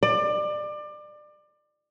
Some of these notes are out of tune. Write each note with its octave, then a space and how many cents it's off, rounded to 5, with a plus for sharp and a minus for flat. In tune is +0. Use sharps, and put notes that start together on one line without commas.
D5 +25